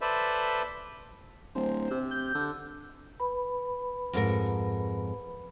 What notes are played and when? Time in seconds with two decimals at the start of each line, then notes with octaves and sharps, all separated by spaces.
0.01 A4 B4 C5 D5 E5
1.55 D1 C5
1.91 C3
2.11 G6
2.35 D3
3.20 B4 B5
4.13 F2 G#2 A#4